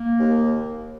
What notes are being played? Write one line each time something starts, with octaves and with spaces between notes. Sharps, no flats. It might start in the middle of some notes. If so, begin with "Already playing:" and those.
Already playing: A#3
D#2